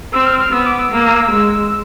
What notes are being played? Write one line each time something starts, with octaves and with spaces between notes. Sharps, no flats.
C4 E6
F6
F6
B3 E6
D6
E6
A#3 E6
G#3